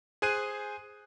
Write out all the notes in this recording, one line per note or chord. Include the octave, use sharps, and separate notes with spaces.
G#4 C5 G#5 F#6 D#7